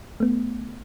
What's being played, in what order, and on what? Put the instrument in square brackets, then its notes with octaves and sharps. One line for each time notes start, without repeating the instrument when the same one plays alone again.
[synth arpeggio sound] A3 B3